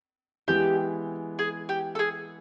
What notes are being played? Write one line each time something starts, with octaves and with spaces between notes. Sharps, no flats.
E3 G#3 B3 E4 G4
G#4
G4
A4
G#4